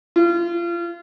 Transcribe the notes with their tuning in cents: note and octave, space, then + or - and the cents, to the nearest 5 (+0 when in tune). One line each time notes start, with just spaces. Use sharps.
F4 -30